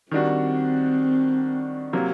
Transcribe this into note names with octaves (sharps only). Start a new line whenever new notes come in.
D#3 G3 C4 D4 F#4
C3 F#3 A#3